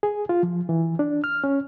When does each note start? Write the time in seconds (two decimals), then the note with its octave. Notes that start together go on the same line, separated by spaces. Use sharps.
0.03 G#4
0.29 F4
0.43 F3
0.69 E3
0.99 D4
1.24 F6
1.44 C#4